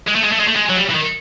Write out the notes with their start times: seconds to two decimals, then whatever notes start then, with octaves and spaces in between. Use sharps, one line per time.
0.08 G#3
0.16 A3
0.24 G#3
0.32 A3
0.39 G#3
0.47 A3
0.55 G#3
0.69 F#3
0.77 G3
0.90 E3
0.95 D#3